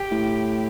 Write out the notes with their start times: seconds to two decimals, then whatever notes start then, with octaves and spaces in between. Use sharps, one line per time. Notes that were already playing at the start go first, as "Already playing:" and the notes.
Already playing: G4
0.11 A2